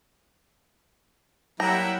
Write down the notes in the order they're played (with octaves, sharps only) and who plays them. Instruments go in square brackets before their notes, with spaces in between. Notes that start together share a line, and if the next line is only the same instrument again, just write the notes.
[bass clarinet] F#3 [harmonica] G3 A#3 E4 [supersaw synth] F#5 G5 [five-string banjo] A#5